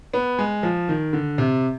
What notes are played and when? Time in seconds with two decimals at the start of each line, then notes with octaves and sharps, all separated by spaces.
0.13 B3
0.39 G#3
0.63 F3
0.88 D#3
1.13 D3
1.38 C3